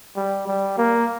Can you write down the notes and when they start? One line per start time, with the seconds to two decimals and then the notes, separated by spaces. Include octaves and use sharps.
0.16 G3
0.47 G3
0.78 A#3